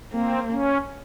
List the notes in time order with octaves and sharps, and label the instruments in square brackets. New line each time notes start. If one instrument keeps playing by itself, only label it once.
[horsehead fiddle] A#3 [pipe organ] C4
[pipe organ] C#4